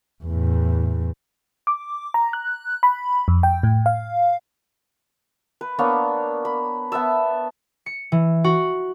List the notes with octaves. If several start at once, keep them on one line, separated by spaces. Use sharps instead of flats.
E2 A2
D6
A#5
F#6
B5
F2
G5
A2
F5
B4
A#3 B3 D4 C#5
B5
B3 E5 A5 E6
C#7
E3
F#4